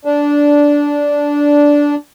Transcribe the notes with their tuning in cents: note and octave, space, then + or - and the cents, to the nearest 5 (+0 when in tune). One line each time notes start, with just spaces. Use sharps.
D4 -10